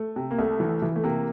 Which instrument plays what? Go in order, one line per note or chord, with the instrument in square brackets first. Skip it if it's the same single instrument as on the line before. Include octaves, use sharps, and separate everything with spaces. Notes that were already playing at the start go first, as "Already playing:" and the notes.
Already playing: [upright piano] A3
C3
[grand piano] A#3
[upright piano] C2 [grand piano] A3
[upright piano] E3
E3
[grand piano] A3
[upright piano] C3 [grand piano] A#3